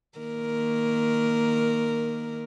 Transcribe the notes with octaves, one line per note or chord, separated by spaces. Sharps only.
D#3 A#3 A#4